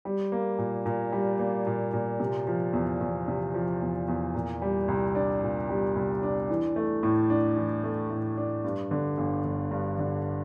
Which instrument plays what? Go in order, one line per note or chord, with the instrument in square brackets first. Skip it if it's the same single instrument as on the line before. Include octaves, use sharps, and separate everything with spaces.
[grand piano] G3
A#3
A#2
A#2
G3
A#3
A#2
A#2
C3
F3
E2
E2
C3
F3
E2
E2
A#2
G3
C2
D4
A#2
G3
C2
D4
E3
A3
A2
D4
E3
A3
A2
D4
G2
D3
G1
G1
G2
D3